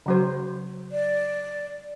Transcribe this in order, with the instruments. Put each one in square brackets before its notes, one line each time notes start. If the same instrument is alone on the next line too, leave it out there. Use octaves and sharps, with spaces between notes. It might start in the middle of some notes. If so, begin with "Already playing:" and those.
[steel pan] C#3 F#3 C5
[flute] D5